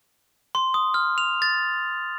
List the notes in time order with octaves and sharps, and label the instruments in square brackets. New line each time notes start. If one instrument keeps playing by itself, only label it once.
[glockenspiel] C6
D#6
F6
F7
A6